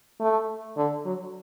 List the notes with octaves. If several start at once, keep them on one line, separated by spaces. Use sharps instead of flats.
A3
D3
F#3